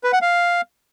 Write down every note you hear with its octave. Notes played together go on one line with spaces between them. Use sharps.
B4
F#5
F5